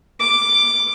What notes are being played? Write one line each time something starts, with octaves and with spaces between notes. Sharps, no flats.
D6